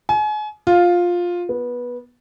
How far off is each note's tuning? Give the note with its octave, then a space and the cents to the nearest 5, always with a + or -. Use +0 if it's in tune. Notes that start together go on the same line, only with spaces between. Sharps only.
G#5 +35
F4 +10
B3 -15